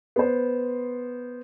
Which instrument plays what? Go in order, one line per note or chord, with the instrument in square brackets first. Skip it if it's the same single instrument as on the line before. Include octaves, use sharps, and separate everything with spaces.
[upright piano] B3 C5